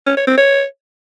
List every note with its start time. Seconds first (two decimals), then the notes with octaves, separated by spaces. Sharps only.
0.07 C#4
0.17 C#5
0.27 C4
0.38 C#5